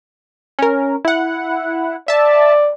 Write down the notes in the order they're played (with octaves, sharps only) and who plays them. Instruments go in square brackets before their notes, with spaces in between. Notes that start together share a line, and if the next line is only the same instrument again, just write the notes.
[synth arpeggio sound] C#4 A#4
E4 F#5
[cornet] D5 [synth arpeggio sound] E5 A5